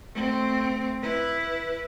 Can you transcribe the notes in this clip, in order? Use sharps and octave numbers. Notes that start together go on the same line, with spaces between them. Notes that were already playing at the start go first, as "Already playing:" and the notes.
A3 C4
E4 B4